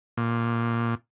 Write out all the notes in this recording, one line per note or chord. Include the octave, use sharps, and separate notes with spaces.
A#2